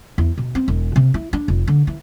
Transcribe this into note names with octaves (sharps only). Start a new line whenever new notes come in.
E2
B2
C4
E1
C3
E4
D4
F1
D3
E3